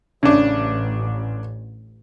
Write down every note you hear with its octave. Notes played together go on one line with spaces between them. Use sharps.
A1 C#3 D4